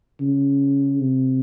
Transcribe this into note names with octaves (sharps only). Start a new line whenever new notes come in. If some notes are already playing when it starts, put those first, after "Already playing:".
C#3
C3